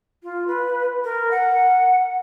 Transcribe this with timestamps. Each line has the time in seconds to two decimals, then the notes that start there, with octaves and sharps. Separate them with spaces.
0.23 F4
0.47 B4
1.04 A#4
1.31 F#5